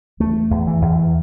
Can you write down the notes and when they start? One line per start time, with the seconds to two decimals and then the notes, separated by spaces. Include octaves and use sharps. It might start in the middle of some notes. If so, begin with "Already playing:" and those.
0.20 E2 A3
0.51 E2
0.67 E3
0.82 E2